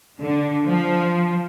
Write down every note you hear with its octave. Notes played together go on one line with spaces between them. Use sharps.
D3
F3